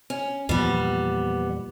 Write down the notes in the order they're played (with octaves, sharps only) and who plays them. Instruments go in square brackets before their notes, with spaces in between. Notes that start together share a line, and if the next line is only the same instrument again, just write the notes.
[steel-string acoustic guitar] C#4
[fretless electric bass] E2 A#2 F3 [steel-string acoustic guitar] G3 B3